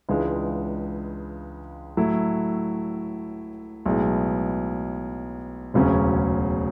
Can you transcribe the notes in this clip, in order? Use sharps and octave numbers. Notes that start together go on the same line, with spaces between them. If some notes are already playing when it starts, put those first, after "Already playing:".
C#2 C#3 E3 G#3 D4
A2 F#3 A3 E4
B1 A2 G#3 B3
E1 D2 C#3 F#3 C#4